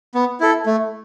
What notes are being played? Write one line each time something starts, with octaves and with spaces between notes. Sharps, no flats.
B3
E4 A4
A3